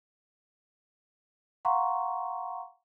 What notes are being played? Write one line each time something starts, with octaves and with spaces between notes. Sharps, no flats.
F5 F#5 A#5 C6 C#6